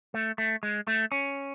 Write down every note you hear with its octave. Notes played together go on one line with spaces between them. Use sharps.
A3
A3
G#3
A3
C#4